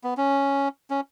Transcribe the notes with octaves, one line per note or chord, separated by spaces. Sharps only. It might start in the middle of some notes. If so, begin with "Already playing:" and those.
B3
C#4
C#4